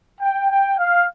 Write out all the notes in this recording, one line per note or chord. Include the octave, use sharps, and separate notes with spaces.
G5
G5
F5